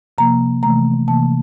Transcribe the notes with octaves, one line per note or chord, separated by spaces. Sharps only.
C3 F3 A#3 A#5
C3 E3 A3 A#5
C3 E3 A#3 A5